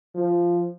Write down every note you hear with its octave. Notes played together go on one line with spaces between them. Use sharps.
F3